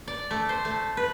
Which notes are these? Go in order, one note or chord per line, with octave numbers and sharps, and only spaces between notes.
D5
A3
C5
A3
B4